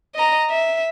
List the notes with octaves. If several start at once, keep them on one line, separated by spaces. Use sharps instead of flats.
D#5 A#5
E5